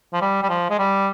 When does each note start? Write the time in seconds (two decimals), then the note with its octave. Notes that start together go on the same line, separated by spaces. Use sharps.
0.13 F3
0.22 G3
0.43 G3
0.49 F3
0.70 G#3
0.79 G3